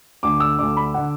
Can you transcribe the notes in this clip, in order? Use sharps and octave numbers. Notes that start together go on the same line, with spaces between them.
D2 D3 D6
E6
D2 D3 D6
B5
D3 F#5